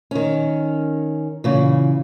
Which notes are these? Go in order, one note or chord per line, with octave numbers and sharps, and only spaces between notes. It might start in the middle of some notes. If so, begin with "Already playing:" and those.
D#3 C#4
A#2 C#3 E3